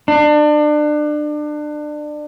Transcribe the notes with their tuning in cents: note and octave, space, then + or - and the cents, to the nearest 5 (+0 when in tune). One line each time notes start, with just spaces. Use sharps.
D4 +30